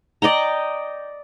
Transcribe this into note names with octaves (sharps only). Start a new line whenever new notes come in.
D5 D#5 G5 A#5